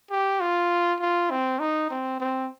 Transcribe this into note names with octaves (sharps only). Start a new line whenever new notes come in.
G4
F4
F4
C4
D#4
C4
C4